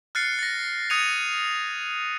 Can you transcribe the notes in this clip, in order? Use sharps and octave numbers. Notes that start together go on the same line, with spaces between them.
F6 F#6 A6 C7 C#7
A6 A#6
D#6 F#6 G#6 C#7 D#7 F7